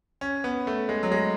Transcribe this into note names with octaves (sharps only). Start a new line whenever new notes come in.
C#4
B3
A3
G#3
F#3
G#3